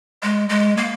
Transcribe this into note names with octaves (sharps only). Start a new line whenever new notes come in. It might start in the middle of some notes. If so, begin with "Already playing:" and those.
G#3
G#3
A#3